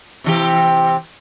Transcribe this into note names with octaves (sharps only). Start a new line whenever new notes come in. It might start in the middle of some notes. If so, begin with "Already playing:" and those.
C3 E3 G4